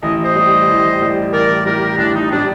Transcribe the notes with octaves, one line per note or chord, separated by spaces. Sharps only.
A1 D#5
C5 D#5
A2 G3
A1
A2 G3
A1 A#4 D5
A2 G3 G4 A#4
A1 D4
D#4
A2 G3 D4